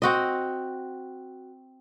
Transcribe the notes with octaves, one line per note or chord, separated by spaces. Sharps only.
C4 F#4 D#5